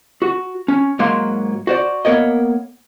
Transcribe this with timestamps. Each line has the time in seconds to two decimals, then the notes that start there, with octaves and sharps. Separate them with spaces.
0.22 F#4
0.68 C#4
0.99 G#2 F#3 A#3 F5 C6
1.67 F#4 C5 D5
2.05 A#3 B3 A#4 C#5 D#5